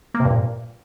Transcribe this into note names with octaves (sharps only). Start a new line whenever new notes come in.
A#3
C3
G2
A#2